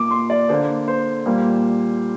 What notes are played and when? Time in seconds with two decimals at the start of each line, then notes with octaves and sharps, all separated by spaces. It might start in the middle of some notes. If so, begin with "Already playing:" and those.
Already playing: A#2 A#3 D6
0.11 C6
0.30 D5
0.49 D3 A#3 C5
0.88 C5
1.26 A#2 G3 A#3